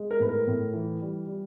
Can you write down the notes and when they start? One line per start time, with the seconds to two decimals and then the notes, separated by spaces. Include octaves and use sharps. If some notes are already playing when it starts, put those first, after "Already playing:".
Already playing: G#3
0.11 A#4
0.20 A2 B4
0.29 A#4
0.47 A2
0.74 E3
1.01 G3
1.27 G3